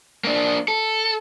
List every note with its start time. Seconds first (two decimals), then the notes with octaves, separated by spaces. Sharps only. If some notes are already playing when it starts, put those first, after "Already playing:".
0.24 A#3 D4
0.68 A4